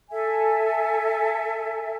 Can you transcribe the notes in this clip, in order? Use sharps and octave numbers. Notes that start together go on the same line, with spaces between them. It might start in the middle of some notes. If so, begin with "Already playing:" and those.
A4 E5 G#5